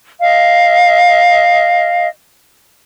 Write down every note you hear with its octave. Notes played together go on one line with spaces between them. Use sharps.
D#5 F5